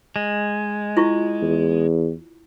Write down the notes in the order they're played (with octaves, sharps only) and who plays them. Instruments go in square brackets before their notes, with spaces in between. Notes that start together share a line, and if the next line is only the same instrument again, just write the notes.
[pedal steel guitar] G#3
[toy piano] E4 F4 C#6
[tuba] E2